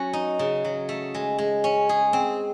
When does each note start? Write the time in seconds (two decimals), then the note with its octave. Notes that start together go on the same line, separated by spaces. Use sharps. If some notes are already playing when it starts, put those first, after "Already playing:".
Already playing: F#3 C#4 F#4
0.13 D#4
0.39 C#3
0.65 F#3
0.89 A3
1.14 G#3
1.38 G#3
1.64 C#4
1.89 G#4
2.13 C4